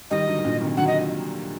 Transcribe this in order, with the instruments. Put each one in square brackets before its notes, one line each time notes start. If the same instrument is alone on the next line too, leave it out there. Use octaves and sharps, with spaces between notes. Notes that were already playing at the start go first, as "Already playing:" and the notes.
[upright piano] D#3 G3 [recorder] D#5
[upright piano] D3 F#3
D#3
A#2 D3
C3 D#3
[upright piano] D3 F#3 [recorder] F#5
[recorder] D#5